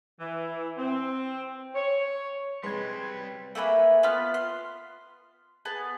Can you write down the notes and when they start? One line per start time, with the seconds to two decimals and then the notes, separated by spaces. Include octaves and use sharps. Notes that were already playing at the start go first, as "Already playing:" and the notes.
0.20 E3
0.77 C4
1.75 C#5
2.63 G3 G#3 C4 B4 C6 G#6
3.55 A3 A#3 G#4 B4
4.03 B3 F4 B4 F6
4.34 C6
5.65 B3 G#4 A5